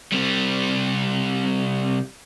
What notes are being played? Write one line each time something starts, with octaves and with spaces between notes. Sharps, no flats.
C3 G3